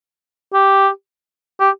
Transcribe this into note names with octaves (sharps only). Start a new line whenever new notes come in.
G4
G4